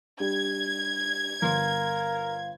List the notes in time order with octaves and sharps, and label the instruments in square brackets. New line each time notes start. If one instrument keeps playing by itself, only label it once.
[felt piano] G3 D4 G4 [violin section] G#6
[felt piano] G1 C6 [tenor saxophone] A#4 [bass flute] F5